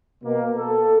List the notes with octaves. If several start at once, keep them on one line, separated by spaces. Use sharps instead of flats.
B2 A#3
A4